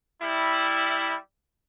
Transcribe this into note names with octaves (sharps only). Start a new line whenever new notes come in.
G3 E4